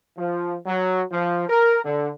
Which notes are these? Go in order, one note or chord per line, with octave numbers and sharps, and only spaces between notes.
F3
F#3
F3
A#4
D3